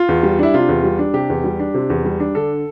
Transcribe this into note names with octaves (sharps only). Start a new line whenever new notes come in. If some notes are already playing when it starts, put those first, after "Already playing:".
Already playing: F4
E2
G3
D4 E4
C3 F4
E2
G3
D4
C3 G4
E2
G3
D4
C3
E2
G3
D4
D3 A4